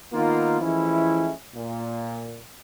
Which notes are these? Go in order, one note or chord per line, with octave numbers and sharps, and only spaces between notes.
D#3 A#3 B3 D#4 F4
E3 F3 G#3 A3 C#4 E4
A#2